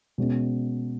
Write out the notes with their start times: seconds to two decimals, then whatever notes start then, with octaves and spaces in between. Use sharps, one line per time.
0.18 B2 G#3 C#4